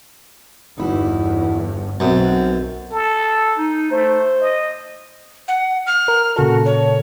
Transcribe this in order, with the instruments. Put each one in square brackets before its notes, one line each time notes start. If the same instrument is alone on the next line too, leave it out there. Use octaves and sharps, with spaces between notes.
[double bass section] G1 E2 G2 [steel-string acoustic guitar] D#4 E4 F#4
[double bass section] B1 B2 [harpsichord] F#2 [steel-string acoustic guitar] B3 C4
[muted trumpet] A4
[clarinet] D#4
[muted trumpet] A3 [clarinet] C5
[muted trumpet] D#5
[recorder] F#5
F6
[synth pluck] A#4
[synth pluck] A#2 C#3 A4 [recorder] F#4
[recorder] C#5